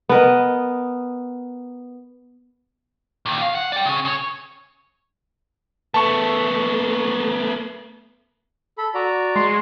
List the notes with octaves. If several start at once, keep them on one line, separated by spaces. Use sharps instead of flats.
B3 A#4 D#5
A#2 D#3
F5
F#5
D5 G5
C#3 C#4
C#3 C#5
A3 B3 A5 C#6
A4 B5
F#4 D5 A#5
G#3 C6